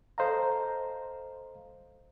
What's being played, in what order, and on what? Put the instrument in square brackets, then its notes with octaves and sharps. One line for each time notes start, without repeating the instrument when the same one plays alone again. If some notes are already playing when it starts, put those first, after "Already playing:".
[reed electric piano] A4 C5 D#5 F5 A#5